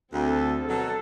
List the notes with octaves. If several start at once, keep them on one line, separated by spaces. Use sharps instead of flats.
D2 C4 A4
B2 F#3 A4